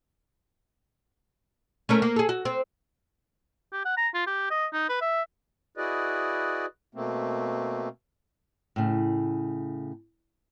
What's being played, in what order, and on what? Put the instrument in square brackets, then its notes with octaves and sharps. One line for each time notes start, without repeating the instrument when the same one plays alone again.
[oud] A3 C#4 A#4
A#3
G#4 A4
F#4
C4
[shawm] G4
F#5
A#5
F4
G4
D#5
D#4
B4
E5
[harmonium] E4 F#4 G#4 B4 D5 D#5
B2 A3 A#3 C4
[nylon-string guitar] A2 C#3